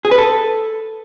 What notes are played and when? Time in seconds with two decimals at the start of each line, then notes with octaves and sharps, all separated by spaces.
0.05 G#4
0.11 B4
0.18 A4